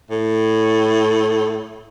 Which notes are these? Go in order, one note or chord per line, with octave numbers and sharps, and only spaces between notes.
A2